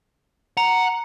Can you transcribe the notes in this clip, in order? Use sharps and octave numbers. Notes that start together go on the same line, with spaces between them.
F#5 A#5